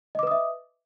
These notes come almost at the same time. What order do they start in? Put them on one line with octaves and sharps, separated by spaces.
D#5 D6 B4 D#6 E5